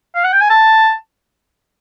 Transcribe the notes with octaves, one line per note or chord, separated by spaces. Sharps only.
F5
F#5
G5
G#5
A5